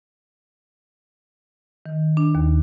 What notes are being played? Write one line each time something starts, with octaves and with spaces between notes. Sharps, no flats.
D#3
D4
D#2